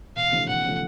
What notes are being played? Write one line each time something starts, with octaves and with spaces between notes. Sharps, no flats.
E1 F5
D#2 C#3 F3 A3
E1 F#5
C#3 F3 A3